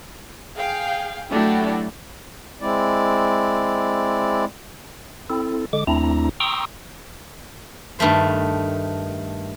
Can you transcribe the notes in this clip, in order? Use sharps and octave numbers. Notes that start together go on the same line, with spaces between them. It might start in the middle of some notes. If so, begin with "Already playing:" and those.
G#4 F5 G5
F#3 A3 D4 E4 F#4 G4
G#3 C4 E4 D5
C4 E4 A4
D3 G#3 D6
D#2 A3 C4 D4 E4 A#5
G5 A#5 C6 C#6 D#6 E6
G2 D#3 A3 C5